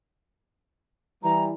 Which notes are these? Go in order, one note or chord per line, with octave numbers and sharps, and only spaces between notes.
E3 G3 A#5